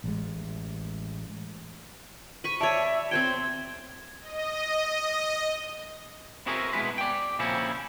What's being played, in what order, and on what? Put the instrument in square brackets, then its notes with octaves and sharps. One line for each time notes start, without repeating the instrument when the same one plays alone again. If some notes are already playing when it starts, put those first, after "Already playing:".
[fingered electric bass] A1 G#3
[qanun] B5 C#6 [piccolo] D#7
[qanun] C#5 D5 [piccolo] E5 [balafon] A5
[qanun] C4 C5 G5 [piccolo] G#6
[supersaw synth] D#5
[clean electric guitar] C4 E4 F#4 G#4 A#4 B4
B2 E3 G#3 E4 B4
D5 G5
A#2 C#3 F3 C4 C#4 E4